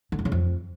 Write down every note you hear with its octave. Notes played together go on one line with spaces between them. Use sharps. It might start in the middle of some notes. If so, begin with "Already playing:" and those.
D3
F2
C#3
F2